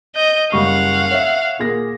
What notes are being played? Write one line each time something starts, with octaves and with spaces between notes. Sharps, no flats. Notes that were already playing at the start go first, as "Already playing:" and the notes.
D#5 G6
F#1 G3 F5 F#5 C#6
C#5 E5
A#2 G#4 A#6